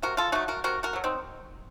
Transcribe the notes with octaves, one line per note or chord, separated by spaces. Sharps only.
C3 F#4 A#4
F4 A4
F#3 A3 D#4 F#4
F#4 A#4
C3 F#4 A#4
F#4 A#4
F#3 A3
C4 D#4